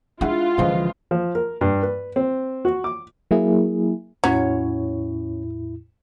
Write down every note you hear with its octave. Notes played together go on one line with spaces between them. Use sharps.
G#3 D4 E4 F4 F#5
C#2 D3 E3 F3 C5 D#5 F5
F3
A#4
G2
B4
C4
F#4
D6
F#3 A#3 E4 G#4
E2 A2 F#3 C#4 E4 C#5